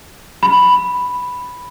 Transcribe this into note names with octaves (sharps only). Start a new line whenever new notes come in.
B5